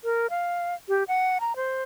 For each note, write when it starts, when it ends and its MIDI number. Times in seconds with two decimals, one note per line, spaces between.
0.04 0.27 70
0.30 0.75 77
0.89 1.04 67
1.08 1.38 78
1.41 1.56 82
1.56 1.83 72